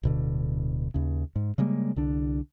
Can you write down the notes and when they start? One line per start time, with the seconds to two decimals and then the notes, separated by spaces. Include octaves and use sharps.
0.03 D1 B2 D3
0.94 D#2 C#3
1.36 G#2
1.58 C#3 G3 G#3 A#3
1.96 C2 D3 D4